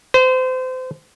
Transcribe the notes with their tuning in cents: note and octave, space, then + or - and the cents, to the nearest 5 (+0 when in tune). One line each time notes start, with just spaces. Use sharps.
C5 -30